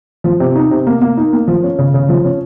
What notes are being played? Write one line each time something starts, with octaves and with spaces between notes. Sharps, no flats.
F3
C3
D#4
C3
A#3
A#3
D#4
A#3
F3
C#4
C#3
C#3
F3
C#4